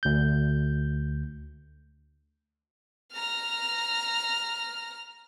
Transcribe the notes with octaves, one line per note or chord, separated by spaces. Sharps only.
D2 G6
A#5 F6